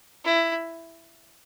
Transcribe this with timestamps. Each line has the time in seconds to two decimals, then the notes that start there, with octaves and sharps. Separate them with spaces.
0.24 E4